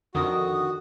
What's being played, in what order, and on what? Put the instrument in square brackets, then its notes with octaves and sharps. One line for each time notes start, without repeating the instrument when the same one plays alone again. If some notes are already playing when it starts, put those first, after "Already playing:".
[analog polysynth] F2 D3 D#3 [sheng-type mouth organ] F#4 [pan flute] D#6